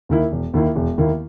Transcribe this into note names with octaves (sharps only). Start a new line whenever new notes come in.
D#2 D#3 A#3 E4
E1
D#2 D#3 A#3 E4
E1
D#2 D#3 A#3 E4